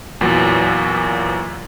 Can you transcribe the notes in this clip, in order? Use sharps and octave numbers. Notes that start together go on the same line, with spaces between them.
E2 A#2 E3 F#3